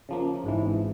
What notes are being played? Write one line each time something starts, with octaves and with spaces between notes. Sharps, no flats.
C#3 F3 A#3
G#1 G#2 E3